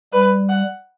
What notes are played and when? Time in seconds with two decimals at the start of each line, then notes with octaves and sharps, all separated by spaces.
0.13 G3 B4
0.49 F#5